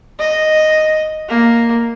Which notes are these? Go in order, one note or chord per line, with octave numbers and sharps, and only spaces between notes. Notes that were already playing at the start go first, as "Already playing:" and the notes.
D#5
A#3